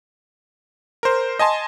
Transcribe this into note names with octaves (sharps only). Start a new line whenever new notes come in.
A#4 C5
D#5 G#5 A5 C6